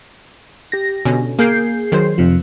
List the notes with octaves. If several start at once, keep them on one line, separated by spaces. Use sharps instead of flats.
G4 A#6
B2 D3 C#4
A#3 G#4 A#4 G6 C7 D7
D#3 F#3 C5
F2 C3 F3